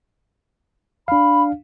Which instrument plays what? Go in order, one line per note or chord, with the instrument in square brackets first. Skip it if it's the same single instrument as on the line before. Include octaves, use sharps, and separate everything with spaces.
[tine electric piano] D4 F5 [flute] B5